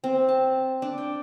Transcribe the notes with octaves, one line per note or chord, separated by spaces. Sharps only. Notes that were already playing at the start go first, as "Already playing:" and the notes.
C4
A5
D4
G5